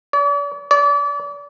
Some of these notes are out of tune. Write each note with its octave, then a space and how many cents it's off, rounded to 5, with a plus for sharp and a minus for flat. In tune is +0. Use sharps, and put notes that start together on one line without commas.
D5 -45
D5 -35